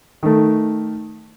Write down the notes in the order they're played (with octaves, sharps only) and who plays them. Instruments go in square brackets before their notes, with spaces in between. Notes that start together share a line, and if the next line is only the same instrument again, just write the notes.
[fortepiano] D#3 A3